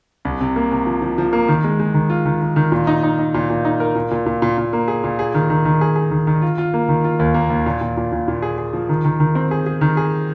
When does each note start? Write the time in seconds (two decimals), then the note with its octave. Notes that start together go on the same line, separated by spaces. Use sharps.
0.25 C2
0.41 C3
0.56 A#3
0.72 C3
0.86 F3
1.02 F3
1.18 F3
1.33 A#3
1.48 D#3
1.64 G#3
1.80 G#3
1.94 D#3
2.10 F4
2.26 D#3
2.42 D#3
2.56 D#3
2.72 A#2
2.87 D#4
3.03 D#4
3.19 D#4
3.34 A#2
3.50 A#2
3.65 D#4
3.80 A#4
3.95 A#2
4.11 A#2
4.26 A#2
4.42 A#2
4.58 A#2
4.73 A#3
4.88 G#4
5.04 A#2
5.19 G#4
5.34 D#3
5.50 D#3
5.65 D#3
5.81 G#4
5.96 G#4
6.11 D#3
6.27 D#3
6.42 F4
6.58 F4
6.74 A#3
6.89 D#3
7.04 F4
7.19 D#2
7.34 A#3
7.50 D#2
7.66 A#2
7.81 A#2
7.97 A#2
8.12 A#2
8.28 A#2
8.42 G#4
8.58 G#4
8.73 F3
8.89 D#3
9.05 D#3
9.20 D#3
9.35 C4
9.51 G#4
9.66 G#4
9.81 D#3
9.97 G#4